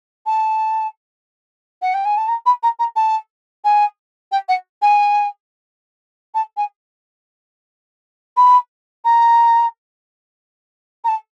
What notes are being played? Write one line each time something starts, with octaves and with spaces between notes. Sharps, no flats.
A5
F#5
G5
G#5
A5
A#5
B5
A#5
A#5
A5
G#5
G5
F#5
G#5
A5
G#5
B5
A#5
A#5
A5